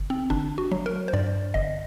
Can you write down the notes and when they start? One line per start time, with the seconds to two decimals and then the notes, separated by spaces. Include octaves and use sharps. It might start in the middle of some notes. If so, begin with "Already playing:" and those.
Already playing: G1
0.10 C4
0.30 G1 D4
0.58 F#4
0.72 F#3
0.86 A#4
1.08 C5
1.13 G2 D5
1.54 G1 D#5